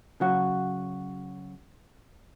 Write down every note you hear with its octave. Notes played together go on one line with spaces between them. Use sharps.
C#3 F#3 F#4